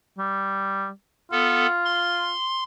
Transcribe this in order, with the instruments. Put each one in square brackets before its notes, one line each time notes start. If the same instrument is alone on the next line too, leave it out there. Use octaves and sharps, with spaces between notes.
[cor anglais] G3
[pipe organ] B3 A4 [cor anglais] F4
[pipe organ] C6